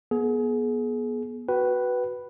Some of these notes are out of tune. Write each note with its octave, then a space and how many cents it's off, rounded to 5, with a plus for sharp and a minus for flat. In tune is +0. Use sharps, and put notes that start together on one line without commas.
B3 -30 G#4 +30
F#4 +0 B4 +0 G5 -35